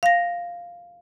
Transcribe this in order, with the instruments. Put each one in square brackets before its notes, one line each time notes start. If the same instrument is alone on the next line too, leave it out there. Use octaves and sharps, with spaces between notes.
[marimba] F5 A#6